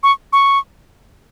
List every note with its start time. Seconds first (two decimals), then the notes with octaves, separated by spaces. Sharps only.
0.03 C#6
0.33 C#6